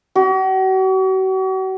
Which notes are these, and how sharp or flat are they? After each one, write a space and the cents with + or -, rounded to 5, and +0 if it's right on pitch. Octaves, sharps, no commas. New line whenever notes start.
F#4 +40